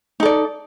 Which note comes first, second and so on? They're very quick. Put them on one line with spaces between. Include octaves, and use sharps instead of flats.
D#4 A4 D5